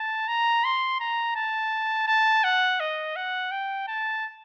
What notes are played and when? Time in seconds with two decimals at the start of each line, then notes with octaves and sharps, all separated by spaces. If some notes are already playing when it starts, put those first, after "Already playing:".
Already playing: A5
0.28 A#5
0.64 C6
1.00 A#5
1.36 A5
2.07 A5
2.44 F#5
2.80 D#5
3.16 F#5
3.51 G5
3.88 A5